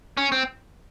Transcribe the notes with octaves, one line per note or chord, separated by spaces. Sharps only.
C#4
C4